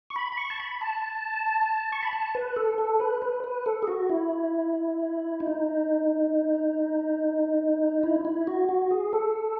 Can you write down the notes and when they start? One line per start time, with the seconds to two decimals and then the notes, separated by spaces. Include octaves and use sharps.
0.10 C#6
0.16 B5
0.32 B5
0.37 C#6
0.50 A5
0.60 B5
0.81 A5
1.92 C#6
2.02 B5
2.13 A5
2.35 B4
2.56 A4
2.78 A4
3.00 B4
3.22 B4
3.44 B4
3.66 A4
3.82 G#4
3.87 F#4
4.09 E4
5.40 D#4
8.03 E4
8.25 E4
8.47 F#4
8.69 F#4
8.91 G#4
9.13 A4